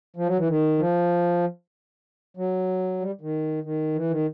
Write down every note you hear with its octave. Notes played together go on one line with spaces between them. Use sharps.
F3
F#3
E3
D#3
F3
F#3
G3
D#3
D#3
E3
D#3